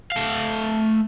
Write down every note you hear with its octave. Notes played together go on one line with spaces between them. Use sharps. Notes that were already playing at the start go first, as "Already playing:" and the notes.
A3 F5